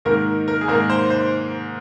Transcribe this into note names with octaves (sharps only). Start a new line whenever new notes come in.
G#2 D#3 A#3 A#4
A#4
G#4
G#2 D#3 A#3 A#4
C5
C5